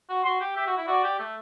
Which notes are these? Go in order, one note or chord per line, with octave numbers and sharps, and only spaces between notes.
F#4
F#4 C6
G4
G4 E5
F#4
E4
F#4 D5
G4
A3